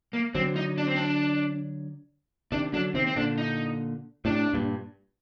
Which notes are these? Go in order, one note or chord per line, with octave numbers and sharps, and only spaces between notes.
A#3
D3 F#3 C4
D#4
D4
C4
D4
C3 D#3 D4
D3 F#3 D4
C3 D#3 C4
C4
A#2 D3 D4
D#4
A2 C3 D4
G2 A#2